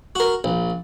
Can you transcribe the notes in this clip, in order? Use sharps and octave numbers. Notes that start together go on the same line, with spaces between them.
F#4 A#4
A#1